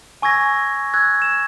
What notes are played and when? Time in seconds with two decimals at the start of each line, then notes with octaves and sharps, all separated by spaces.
0.22 G#5 C#6 E6 G#6 A#6
0.94 E6 F#6 G#6
1.22 E7